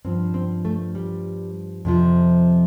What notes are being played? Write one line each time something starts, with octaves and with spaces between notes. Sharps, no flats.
G2 F3 C4
C4
A3
G3
F2 C3 F3